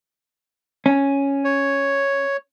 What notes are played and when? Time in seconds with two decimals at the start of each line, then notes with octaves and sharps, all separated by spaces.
0.86 C#4
1.44 C#5